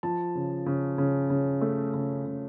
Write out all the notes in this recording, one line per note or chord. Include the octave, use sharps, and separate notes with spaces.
F3 A5
C#3
C#3
C#3
C#3
A3
C#3
C#3